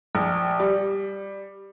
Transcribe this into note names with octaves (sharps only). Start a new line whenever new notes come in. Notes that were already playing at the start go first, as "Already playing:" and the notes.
A#1
G3